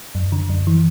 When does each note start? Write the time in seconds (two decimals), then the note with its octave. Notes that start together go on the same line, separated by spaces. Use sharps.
0.15 F#2
0.32 D3
0.50 F#2
0.67 E3